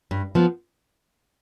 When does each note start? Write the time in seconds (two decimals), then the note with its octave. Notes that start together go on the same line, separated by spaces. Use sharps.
0.11 G2
0.35 F3 B3